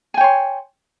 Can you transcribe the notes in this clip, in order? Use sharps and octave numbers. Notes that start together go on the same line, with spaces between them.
C#5 G5 G#5 C6